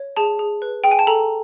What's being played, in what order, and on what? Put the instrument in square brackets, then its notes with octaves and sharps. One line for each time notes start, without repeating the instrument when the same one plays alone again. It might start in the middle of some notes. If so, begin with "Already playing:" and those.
Already playing: [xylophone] C#5
G#4 A5
G#4
B4
G#4 G5
G#5
A5
A4 A#5